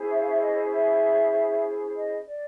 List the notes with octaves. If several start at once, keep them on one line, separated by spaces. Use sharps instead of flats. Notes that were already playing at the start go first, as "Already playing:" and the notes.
Already playing: C#4 E4 G#4 C5
E5
F5
E5
D#5
E5
D#5
D5